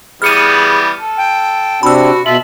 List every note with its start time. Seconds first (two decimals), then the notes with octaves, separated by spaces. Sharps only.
0.22 E3 G3 B3 G#4 F6 C#7 D#7
0.98 A4
1.17 G5
1.83 C3 C4 D4 F#4 B5 E6
2.26 B2 F4 A4 E5 F#7